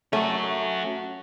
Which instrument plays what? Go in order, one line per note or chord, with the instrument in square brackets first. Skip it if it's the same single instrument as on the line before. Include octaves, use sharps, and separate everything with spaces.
[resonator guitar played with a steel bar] A3 [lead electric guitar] C#4 F#4